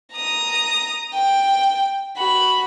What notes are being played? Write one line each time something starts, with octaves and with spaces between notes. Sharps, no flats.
A#5 D#6
G5
F#4 B5